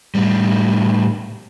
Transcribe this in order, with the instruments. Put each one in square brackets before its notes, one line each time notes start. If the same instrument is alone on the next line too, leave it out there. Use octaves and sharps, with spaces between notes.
[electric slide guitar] A2 G3